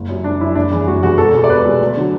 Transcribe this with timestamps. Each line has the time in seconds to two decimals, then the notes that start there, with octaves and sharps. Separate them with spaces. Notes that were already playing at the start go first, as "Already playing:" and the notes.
Already playing: F#1
0.09 F#2 F#3
0.24 F#1 D4
0.40 F#2 E4
0.44 F#3
0.55 F#1 D4
0.71 E2 E3
0.87 F#1 F#4
1.03 E2 E3 F#4
1.18 E1 A4
1.33 E2 B2
1.44 D5
1.50 E1 B4
1.65 E2 B2
1.80 D2
1.96 D3 F#3